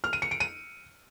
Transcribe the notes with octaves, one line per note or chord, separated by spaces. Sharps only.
F6
D#7
C#7
D7
D#7